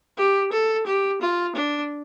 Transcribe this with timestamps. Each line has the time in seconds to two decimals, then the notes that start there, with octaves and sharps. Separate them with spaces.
0.17 G4
0.52 A4
0.87 G4
1.21 F4
1.56 D4